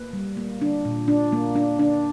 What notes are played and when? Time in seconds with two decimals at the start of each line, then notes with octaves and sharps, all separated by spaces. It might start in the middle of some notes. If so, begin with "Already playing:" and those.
Already playing: A#3 B4
0.13 G3
0.37 A#3
0.62 D4
0.85 A#2
1.08 D4
1.32 A#3
1.55 D4
1.79 D4